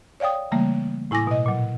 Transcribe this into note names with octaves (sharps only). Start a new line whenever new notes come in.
C#5 D5 F5 G5 D#6
C#3 E3 G3 A3 A#3
A2 E4 G#5 D6 A#6
B2 D#5
A#2 F#3